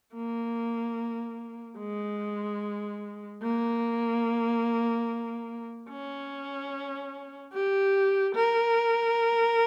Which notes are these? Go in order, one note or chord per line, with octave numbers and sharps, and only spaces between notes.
A#3
G#3
A#3
C#4
G4
A#4